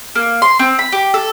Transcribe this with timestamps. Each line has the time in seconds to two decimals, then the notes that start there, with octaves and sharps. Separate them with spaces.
0.15 A#3
0.42 C6
0.59 C4
0.79 B5
0.92 G4
1.14 A4